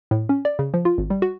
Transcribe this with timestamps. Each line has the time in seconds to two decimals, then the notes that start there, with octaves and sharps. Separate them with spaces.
0.11 A2
0.29 C#4
0.45 D5
0.59 C#3
0.74 F3
0.85 F4
0.98 G#1
1.10 G3
1.22 F#4